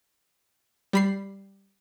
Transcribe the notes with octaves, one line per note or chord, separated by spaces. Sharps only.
G3 B5 C7